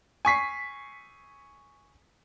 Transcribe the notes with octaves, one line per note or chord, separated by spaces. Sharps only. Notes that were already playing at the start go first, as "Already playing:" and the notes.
G#5 C#6 B6 C7